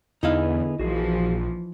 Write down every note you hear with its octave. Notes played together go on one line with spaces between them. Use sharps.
E2 D3 B3 D#4 E4 G#4 F5
A#1 E3 F3 F#4 G#4